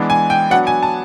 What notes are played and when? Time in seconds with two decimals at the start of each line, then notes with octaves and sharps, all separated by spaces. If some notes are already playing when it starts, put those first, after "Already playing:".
Already playing: E3 G#3 B3 D4
0.10 G#5
0.30 G5
0.50 F#3 B3 D4 F#5
0.67 G#5
0.83 A5